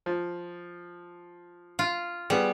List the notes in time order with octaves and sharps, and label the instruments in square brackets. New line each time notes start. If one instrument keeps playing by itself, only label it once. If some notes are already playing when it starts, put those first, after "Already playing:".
[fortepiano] F3
[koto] F4
[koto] G3 [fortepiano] B3 G#4